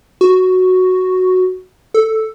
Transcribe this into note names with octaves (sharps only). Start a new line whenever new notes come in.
F#4
A4